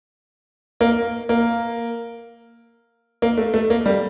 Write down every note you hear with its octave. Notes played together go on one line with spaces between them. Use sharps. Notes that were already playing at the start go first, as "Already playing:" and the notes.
A#3
A#3
A#3
A3
A3
A#3
G3